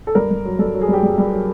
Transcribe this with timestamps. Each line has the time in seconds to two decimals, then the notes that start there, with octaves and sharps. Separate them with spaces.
0.07 A4
0.15 G2 A#4
0.30 G2
0.45 F#3
0.59 G2 A4
0.74 F#3
0.81 G#4
0.88 G2 G4
1.03 G2 G#4
1.18 G2
1.33 F#3